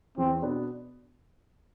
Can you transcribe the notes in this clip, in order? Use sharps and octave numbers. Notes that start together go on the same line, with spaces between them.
E2 C4
B2 B3 D4